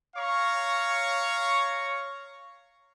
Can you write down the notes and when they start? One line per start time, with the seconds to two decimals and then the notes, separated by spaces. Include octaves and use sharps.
0.16 C#5 F5 A#5 C#6